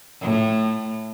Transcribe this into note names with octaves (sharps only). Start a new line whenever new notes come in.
A2